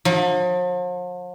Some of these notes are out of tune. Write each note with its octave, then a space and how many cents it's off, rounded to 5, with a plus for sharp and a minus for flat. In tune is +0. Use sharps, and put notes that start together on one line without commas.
F3 +45